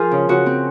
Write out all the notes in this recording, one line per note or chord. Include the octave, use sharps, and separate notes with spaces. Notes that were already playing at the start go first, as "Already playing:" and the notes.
Already playing: F3 F4 G#4 A#4
C#3
C#3 F#4
C4